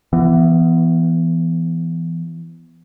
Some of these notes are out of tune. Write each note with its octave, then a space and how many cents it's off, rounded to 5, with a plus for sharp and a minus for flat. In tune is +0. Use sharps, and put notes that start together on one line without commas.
E3 +25 B3 +0